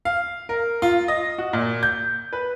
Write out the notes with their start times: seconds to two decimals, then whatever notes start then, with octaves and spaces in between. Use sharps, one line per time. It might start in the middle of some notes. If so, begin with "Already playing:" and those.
0.05 F5
0.49 A#4
0.82 F4
1.08 D#5
1.38 F#4
1.53 A#2
1.83 G6
2.33 B4